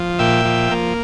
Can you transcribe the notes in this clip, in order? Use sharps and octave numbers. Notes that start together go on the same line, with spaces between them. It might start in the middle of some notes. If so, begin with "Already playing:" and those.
Already playing: F3
A#2 E5 G5
F3
A#3